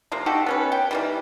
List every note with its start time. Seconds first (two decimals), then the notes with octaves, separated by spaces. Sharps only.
0.12 C3 F3 A#3
0.26 D#4 F#4 G4 A4
0.46 B3 C#4 B4
0.72 G5
0.91 D#3 E3 G3